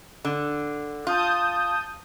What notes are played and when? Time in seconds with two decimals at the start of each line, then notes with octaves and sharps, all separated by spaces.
0.25 D3
1.07 F4 A5 D#6 G6